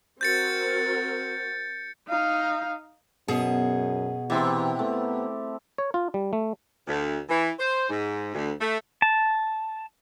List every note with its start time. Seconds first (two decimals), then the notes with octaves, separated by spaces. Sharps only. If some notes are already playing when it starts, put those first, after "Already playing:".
0.21 C4 F#4 A#4 G6 A6 C#7
2.08 D#4 F5
3.28 F#2 B2 G#4
4.30 C3 E3 C4 E4 G4
4.79 A3 B3
5.78 C#5
5.94 F4
6.14 G3
6.33 A3
6.88 D2
7.29 E3
7.59 C5
7.89 G#2
8.34 D2
8.59 A3
9.02 A5